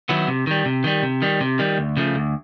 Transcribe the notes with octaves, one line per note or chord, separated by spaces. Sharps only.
D#3 F#3 B3 E4
C3
D#3 G3
C3
D#3 G3
C3
D#3 G3
C3
D#3 G3
D2
C#3 F3 A3
D2